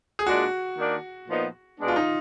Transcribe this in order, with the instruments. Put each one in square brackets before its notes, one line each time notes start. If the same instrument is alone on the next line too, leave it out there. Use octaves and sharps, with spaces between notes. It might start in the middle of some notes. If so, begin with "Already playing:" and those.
[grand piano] G#4
[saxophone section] A#2 G#3 D4 [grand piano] F#4
[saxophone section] D#3 A#3 D4
A#2 F3 B3 D#4
B2 G#3 B3 D4
[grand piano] F4
D#4